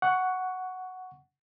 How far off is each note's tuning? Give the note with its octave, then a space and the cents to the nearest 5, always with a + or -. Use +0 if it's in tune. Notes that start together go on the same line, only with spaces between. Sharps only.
F#5 +0 C#6 +15